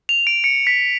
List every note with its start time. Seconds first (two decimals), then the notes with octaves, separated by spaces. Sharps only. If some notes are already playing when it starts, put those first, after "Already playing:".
0.09 F7
0.27 D7
0.44 C#7
0.67 B6